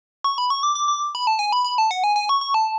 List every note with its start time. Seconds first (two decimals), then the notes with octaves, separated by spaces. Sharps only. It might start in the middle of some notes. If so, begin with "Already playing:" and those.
0.24 C#6
0.38 B5
0.50 C#6
0.63 D6
0.75 D6
0.88 D6
1.15 B5
1.27 A5
1.39 G#5
1.52 B5
1.64 B5
1.78 A5
1.91 F#5
2.04 G#5
2.16 G#5
2.29 C#6
2.41 C#6
2.54 A5